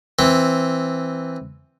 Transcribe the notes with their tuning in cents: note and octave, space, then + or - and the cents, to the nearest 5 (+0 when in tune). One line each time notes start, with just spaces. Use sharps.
E3 +0 C4 +0